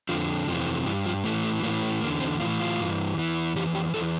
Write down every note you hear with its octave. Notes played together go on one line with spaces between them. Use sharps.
F2 D3 F3
F2 C3 E3 F3
G2 E3
F3
A2 E3 A3
A3
A2 E3 A#3
A3
E2 D3 A#3
C4
A2 E3 F4
F4
G2 E3
E2 E3
F2 E3 G4
G4
E2 E3 A4